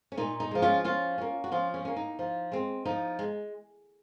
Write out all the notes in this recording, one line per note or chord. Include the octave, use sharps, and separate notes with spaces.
C#4
A#2 D#4
D#4
F3 G#3
C#4 F4
F3 C#4 F4
A#3 C#4
F#4
F3 C#4 F4
C#4
A#3 C#4
D#4
F3
G#3 C4
F3 D#4
G#3